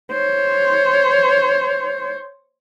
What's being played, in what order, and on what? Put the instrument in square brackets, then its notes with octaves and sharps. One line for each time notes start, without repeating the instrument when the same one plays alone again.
[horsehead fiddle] C5 C#5